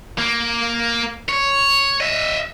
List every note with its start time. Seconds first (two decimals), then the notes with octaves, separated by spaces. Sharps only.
0.18 A#3
1.29 C#5
2.01 D#5 E5